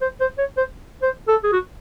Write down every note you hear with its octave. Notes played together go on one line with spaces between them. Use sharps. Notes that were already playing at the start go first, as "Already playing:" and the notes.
C5
C5
C#5
C5
C5
A4
G#4
F#4